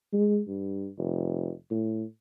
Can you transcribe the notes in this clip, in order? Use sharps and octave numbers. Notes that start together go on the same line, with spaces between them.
G#3
G2
F1
A2